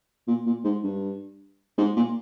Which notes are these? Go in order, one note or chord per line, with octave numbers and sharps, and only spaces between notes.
A#2
A#2
G#2
G2
G#2
A#2